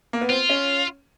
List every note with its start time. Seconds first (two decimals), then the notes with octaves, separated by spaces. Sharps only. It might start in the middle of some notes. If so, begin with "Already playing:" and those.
0.13 A#3
0.21 B3
0.30 C4 F4
0.50 C#4